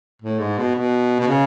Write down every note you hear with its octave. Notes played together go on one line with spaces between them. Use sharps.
A2
G#2
B2
B2
B2
C#3